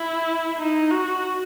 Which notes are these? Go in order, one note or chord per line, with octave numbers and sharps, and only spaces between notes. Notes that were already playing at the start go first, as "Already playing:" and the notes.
Already playing: E4
D#4
F#4